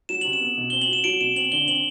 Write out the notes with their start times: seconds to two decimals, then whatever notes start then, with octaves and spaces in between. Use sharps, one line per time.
0.09 F#3 E7
0.21 C3 F#7
0.33 E7
0.41 B3
0.57 B2
0.70 C4 G7
0.82 F#7
0.88 F#4 E7
1.04 F#3 D7
1.21 B2 E7
1.36 C4 F#7
1.52 D3 G7
1.68 C4 F#7